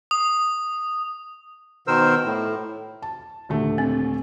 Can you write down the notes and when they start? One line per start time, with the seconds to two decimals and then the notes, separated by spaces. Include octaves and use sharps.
0.11 D#6
1.87 B2 D#3 A#4 C5 E6
2.25 A2
3.02 A5
3.49 D#1 D3 A3
3.78 C4